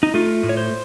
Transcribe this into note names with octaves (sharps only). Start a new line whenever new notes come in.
D#4
A3 F4
A2
C#5
C5